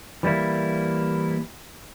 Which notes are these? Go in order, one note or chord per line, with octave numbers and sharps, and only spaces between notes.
E3 G3 A#3 E4